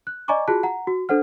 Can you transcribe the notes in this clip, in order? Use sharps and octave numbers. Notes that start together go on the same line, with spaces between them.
F#6
D5 D#5 G#5 A#5 C#6 D6
F4 F#4 G#4 A5 F#6
F#5 A#5
F#4
D4 A4 C5 F#5 F6